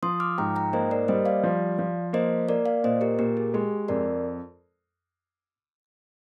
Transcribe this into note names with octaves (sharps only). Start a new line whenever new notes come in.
F3 C6 D#6
D6 F6
G#2 G5 A#5
G5 A#5
A#3 C5 D#5
A#4 D5
G3 C5 D#5
D5 F5
F3
F3
A#3 C5 D#5
A#3 A#4 D5
D5 F5
A#2 C5 D#5
G4 A#4
A#2 G4 A#4
G#4
G#3 G4
F2 A#4 D5